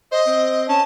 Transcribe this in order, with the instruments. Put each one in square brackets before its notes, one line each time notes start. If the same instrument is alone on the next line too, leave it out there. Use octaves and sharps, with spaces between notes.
[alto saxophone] C5 [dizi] D#5
[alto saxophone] C4
[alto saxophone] C#4 [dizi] A5